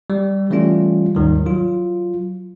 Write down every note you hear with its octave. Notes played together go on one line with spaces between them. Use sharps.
G3
E3 G3 A3 C#4 F4
D#2 G#2 D#3 G3
F#3 F4